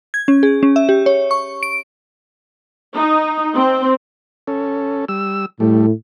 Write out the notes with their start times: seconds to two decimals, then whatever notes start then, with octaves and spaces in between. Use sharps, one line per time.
0.14 G#6
0.28 C#4
0.43 G#4
0.63 C#4
0.76 E5
0.89 G4
1.06 C#5
1.31 C#6
1.63 D7
2.96 D#4
3.55 C4
4.47 C#4 A4
5.09 G3 E6
5.60 A2 G3 A3